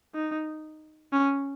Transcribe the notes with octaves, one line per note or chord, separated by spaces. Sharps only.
D#4
C#4